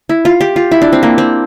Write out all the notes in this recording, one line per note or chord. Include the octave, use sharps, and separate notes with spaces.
E4
F4
G4
F4
E4
D4
C4
A#3
C4